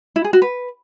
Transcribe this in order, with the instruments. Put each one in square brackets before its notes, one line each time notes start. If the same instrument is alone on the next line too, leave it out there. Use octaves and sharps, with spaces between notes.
[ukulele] E4
G#4
F#4
B4